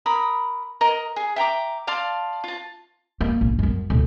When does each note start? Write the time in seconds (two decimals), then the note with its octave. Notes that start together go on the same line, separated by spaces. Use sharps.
0.06 A#4 B5 D#6
0.81 A#4 D#5
1.16 G#4
1.36 E5 G5 A#5 D6
1.87 D5 F5 A5 C6
2.44 F4 A5
3.21 A#3
3.41 A#1
3.59 F#2 F#3
3.90 D2 A#2